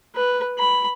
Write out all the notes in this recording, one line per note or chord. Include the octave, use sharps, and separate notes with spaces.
B4
B5